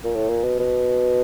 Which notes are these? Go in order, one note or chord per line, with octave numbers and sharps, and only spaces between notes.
A#2
A2
A#2
B2
B2